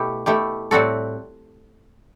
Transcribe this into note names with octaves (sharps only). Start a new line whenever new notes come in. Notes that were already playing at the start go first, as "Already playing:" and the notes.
Already playing: B2 A3 E4 G4
B2 A3 E4 G4
A2 G3 C4 F#4 A4